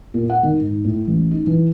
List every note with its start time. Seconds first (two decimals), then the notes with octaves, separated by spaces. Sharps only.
0.14 A#2
0.30 F#5
0.43 D#3
0.60 G#2
0.84 A2
1.08 A1
1.31 D#4
1.47 E3